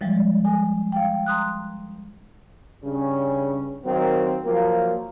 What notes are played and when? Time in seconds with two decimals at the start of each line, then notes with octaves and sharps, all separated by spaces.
0.01 E3 F3 G3 G#3
0.45 G#5
0.92 F5 G5
1.26 A#5 C6 D#6 F#6
2.83 G2 C#3 C#4
3.86 D#3 F#3 A#3 C4
4.44 F3 F#3 A#3